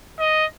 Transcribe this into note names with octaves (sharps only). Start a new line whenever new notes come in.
D#5